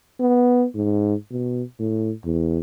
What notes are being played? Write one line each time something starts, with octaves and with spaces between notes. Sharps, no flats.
B3
G#2
B2
A2
E2